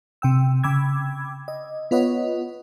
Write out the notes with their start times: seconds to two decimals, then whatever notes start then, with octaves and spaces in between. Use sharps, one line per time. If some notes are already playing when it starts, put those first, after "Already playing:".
0.22 C3 G5 E6
0.63 C#3 G5 B5 D6 E6 G#6
1.48 D#5
1.91 B3 F4 B4 C#5 D#5 F#5